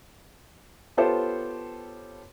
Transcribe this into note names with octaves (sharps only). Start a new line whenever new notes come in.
B3 F4 G4 A4 C5 C#5